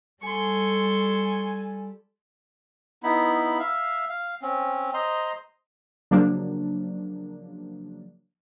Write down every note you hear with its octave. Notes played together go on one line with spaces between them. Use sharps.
G3 A4 G#5 C6 C#6
B3 D#4 E4 B5
E5 F5
F5
C4 C#4
C5 D#5 A#5 C6
C#3 F3 F#3 A#3 D4